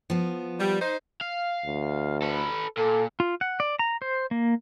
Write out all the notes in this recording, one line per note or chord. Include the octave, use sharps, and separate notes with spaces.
F3 B3
G3
D#4 C5
F5
D2
A4 B4
A#2 A4
F4
F#5
D5
A#5
C5
A#3